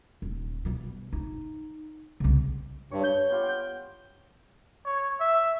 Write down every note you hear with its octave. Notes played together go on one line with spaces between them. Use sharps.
D#1
B2 G3
D#4
C2 C#3
G2 C#5
G6
B3 F4 G4
G5
C#5
E5